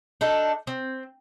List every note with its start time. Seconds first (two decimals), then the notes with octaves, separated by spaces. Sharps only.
0.21 D4 D#4 A4
0.67 C4